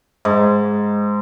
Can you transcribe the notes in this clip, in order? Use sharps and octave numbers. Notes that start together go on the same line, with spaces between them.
G#2